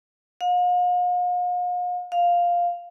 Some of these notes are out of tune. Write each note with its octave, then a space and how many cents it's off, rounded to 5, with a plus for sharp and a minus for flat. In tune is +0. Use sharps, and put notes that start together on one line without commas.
F5 +45
F5 +0